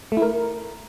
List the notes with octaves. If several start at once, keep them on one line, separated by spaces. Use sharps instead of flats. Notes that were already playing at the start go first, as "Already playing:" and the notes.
A3
E4
A#4